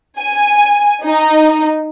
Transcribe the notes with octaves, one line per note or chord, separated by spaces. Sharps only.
G#5
D#4